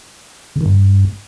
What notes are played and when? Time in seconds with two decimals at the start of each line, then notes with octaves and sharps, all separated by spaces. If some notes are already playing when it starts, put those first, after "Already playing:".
0.56 C#3
0.61 D#3
0.66 G2